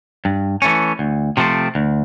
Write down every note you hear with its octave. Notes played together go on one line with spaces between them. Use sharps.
G2
E3 A3 C#4
D2
C3 F3 A3 C4
D2